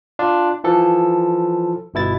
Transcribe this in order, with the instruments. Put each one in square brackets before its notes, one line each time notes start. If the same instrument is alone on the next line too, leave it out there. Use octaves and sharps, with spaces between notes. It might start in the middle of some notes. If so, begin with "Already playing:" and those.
[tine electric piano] D4 F4
E3 F3 A4
G1 B2 E4 A6